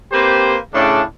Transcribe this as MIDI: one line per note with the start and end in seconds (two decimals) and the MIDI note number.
0.12 0.57 58
0.12 0.57 60
0.12 0.57 67
0.12 0.57 71
0.12 0.57 72
0.73 1.02 45
0.73 1.02 49
0.73 1.02 62